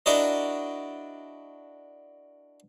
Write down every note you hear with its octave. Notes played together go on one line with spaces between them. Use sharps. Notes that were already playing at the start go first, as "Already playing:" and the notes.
D4 E4 F#4 A#4 D5 D#5